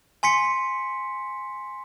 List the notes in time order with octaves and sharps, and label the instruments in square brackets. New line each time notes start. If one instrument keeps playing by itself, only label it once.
[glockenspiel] G#5 C6 B6 C#7